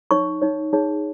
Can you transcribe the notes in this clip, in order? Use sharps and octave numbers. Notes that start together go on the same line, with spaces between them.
D#4 C#5 C#6
D#4 C#5
D#4 G#4 C#5